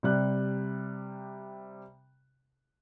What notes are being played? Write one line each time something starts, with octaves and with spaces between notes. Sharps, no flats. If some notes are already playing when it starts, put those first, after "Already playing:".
C3 G3 F#6